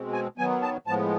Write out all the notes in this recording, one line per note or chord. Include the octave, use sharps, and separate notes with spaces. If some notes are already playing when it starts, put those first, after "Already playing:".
Already playing: B2 G#3 C4
G#5
D#3 F#3 B3 G#5
A5
A2 F3 G#3 B3 A5